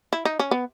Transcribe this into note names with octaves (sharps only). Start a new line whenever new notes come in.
E4
D#4
C#4
B3